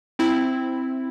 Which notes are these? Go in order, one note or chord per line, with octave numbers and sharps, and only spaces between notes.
C4 E4